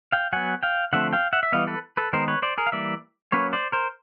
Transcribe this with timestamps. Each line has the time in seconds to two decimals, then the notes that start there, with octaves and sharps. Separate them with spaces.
0.12 F5 G5
0.33 F#3 B3 F#5 G#5
0.63 F5 G5
0.93 D3 F3 A3 C4 E5 F#5
1.13 F5 G5
1.33 E5 F#5
1.43 E5
1.52 E3 G3 B3 D#5 F5
1.67 A4 B4
1.97 A4 B4
2.13 D#3 G#3 B3 A#4 C5
2.28 B4 C#5
2.42 C5 D5
2.58 G#4 A#4
2.67 F5
2.72 E3 G3 A#3 D5 E5
3.32 F#3 A#3 C#4 B4 C#5
3.53 C5 D5
3.72 A#4 C5